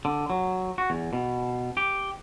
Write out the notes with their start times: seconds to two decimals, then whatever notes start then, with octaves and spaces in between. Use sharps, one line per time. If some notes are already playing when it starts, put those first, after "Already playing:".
0.05 D3
0.30 F#3
0.78 F#4
0.90 E2
1.13 B2
1.77 G4